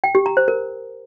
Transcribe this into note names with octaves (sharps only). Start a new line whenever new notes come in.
G5
G4
A#5
C5
A#4